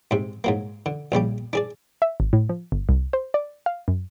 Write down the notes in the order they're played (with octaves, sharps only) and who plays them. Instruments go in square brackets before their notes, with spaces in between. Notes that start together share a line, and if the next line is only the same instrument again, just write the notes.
[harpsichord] G#2 C3
G#2 F#3 A#3
D3
A#1 C#3 G3 G4
D4 G#4 D5
[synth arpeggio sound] E5
G#1
A2
F3
G1
C2
C5
D5
F5
F#2